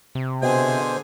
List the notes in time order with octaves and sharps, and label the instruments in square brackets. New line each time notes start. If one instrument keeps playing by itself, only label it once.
[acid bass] C3
[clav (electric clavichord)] B2 [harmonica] D3 G#4 G#5 [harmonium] C5